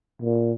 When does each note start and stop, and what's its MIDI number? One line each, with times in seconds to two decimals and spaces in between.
0.22 0.52 46